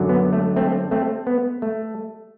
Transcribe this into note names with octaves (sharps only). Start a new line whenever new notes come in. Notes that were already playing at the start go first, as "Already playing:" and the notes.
Already playing: F#2 D3 F#3
B3
A3
A3 C4
A3 C4
B3
A3